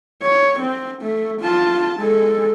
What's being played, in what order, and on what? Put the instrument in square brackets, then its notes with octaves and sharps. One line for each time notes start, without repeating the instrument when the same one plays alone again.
[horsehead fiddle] C#5
C4
A3
F4 A5
G#3 A4